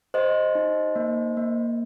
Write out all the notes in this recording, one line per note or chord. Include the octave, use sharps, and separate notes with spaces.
G4 C5 D#5
D#4
A#3
A#3